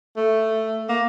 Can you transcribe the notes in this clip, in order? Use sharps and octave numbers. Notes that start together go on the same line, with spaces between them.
A3
A#3